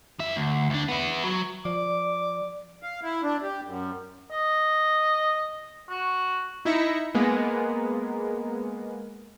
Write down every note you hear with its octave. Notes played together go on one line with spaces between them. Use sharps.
F3 E5
D2
D2 D4
B3 E4
F#3
F3 D5 D6
F5
E4
D4
G4
F#2
D#5
F#4
D#4 E4 E5 A#6 C#7
G#3 A#3 B3 G#4 A#4